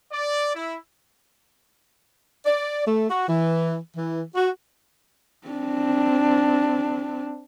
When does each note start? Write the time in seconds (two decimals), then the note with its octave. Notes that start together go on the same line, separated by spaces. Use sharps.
0.11 D5
0.54 E4
2.46 D5
2.86 A3
3.09 F#4
3.29 E3
3.97 E3
4.35 F#4
5.47 C4 D4